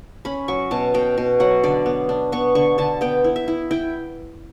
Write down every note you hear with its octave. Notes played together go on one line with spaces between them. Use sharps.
C#4 B5
F#3 C#6
B2 A5
B2 G5
B2
F#3 F#5
D3 D5
B3
D4
B3 C#6
D3 C#6
D3 A5
B3 G5
E4
E5
E4
E4 G5